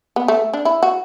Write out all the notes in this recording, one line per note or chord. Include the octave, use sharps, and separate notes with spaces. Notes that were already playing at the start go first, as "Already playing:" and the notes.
B3
A3
D4
E4
F#4